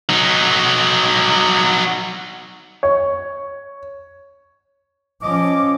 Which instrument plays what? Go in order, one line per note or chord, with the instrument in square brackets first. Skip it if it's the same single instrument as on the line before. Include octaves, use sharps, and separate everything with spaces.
[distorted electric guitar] F#3 D#4
[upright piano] C#5
[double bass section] F3 C#4 [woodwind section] D#5 D6